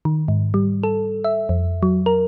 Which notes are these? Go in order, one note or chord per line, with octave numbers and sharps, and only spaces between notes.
D#3
G#2
G3
A4
E5
F2
F#3
A#4